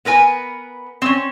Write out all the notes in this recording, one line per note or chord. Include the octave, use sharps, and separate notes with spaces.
B3 A#4 B4 G#5
C4 C#4